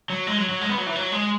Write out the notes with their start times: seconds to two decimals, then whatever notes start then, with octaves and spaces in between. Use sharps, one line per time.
0.10 F#3
0.27 G#3
0.38 F#3
0.49 F#3
0.61 G#3
0.69 B3
0.78 F#3
0.86 E3
0.96 F#3
1.12 G#3